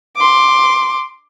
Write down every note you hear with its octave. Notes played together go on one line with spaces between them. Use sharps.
C6 D6